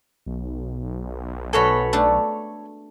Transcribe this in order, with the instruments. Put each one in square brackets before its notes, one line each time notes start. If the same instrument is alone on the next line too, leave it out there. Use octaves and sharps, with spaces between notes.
[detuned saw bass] B1
[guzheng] B2 F#4 G#4 [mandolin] A4 C#5 B5
[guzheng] A3 D4